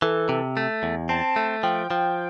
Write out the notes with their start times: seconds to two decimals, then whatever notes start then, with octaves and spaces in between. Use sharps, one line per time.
0.02 E3 A4
0.29 C3
0.57 A3
0.83 E2
1.09 C4 A5
1.36 A3
1.63 F3 G5
1.91 F3